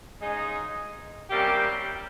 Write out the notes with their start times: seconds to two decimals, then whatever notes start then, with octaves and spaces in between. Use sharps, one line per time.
0.20 C#3 G#3 D#4 G#4
1.29 C3 G3 A#3 C#4 G4